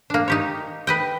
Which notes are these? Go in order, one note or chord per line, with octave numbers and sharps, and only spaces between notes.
A#3 D4
D#4 G4 C#5
B4 D#5 G5